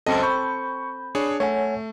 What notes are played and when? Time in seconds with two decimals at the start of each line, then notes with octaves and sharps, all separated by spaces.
0.07 C#2 F#2 C4 A4 D#5
0.23 B5 C#6 G6
1.15 D4 G#4 C#5
1.40 A3 C#5 F#5 G#5